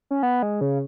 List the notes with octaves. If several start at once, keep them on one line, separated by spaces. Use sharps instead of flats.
C#4
B3
G#3
C#3